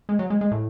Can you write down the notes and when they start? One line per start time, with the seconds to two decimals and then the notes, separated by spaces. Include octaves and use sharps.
0.09 G#3
0.19 F#3
0.30 G#3
0.41 G#3
0.51 A2